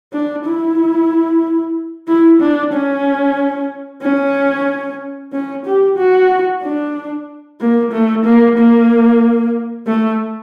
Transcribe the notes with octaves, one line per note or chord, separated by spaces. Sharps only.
D4
E4
E4
D4
C#4
C#4
C#4
G4
F#4
D4
A#3
A3
A#3
A#3
A3